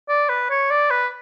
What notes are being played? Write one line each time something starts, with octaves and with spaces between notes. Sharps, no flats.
D5
B4
C#5
D5
B4